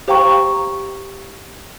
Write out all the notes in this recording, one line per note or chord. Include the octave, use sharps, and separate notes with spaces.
G4 C5 F5 G5 A#5 C#6